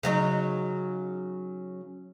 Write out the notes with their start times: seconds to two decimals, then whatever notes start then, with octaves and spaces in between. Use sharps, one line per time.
0.03 C#3 F#3 D#4